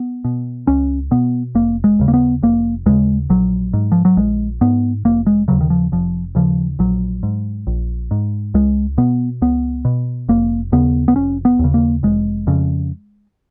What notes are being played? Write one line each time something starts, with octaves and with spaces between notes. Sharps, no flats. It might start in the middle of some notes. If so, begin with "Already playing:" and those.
Already playing: B3
B2
C#2 C#4
B2 B3
F1 A#3
G#3
D#2 C#3
A#3
B3
F1 A#3
D#2 C#3 G#3
A#1 F#3
G#2
F3
F#3
A#1 G#3
G#2 B3
F1 A#3
G#3
D#2 C#3 F#3
D#3
F3
F1 F3
D#2 C#3 F3
A#1 F#3
G#2
A#1
G#2
C#2 G#3
B2 B3
C#2 B3
B2
F1 A#3
D#2 C#3 B3
B3
F1 C#4
B3
D#2 C#3
A#3
F1 G#3
F2 C#3